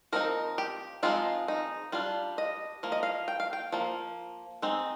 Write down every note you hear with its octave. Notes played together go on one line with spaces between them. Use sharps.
F3 C4 D#4 A#4
G4
F3 G#3 C4 D#4 F4
D#4
G3 D4 F4
D#5
F3 A#3
D#5
F5
G5
F5
G5
F3 A#3
G#3 C4 D#4